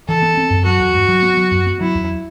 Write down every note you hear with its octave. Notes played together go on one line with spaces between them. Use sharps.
E3 A4
B3
C4
F#2
F#3 F#4
E2
G2
F#3
B3
F#3
F#2
B3
F#3 E4
E2